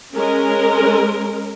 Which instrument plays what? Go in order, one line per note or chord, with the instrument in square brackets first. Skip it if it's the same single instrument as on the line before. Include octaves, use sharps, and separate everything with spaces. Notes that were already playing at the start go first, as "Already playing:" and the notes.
[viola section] G#3 C#4 A#4